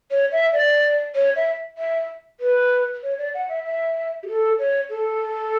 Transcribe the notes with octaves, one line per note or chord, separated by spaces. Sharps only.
C#5
E5
D5
C#5
E5
E5
B4
C#5
D5
F#5
E5
E5
G4
A4
C#5
A4